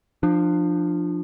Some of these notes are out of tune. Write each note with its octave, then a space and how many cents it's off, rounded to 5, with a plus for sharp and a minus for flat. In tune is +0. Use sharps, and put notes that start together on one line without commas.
F3 +0 D4 +25